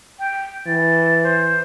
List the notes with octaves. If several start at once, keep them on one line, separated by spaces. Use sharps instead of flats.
G5
E3 A6
C5